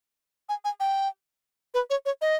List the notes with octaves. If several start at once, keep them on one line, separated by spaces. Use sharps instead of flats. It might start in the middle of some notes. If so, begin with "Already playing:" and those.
G#5
G#5
G5
B4
C#5
C#5
D#5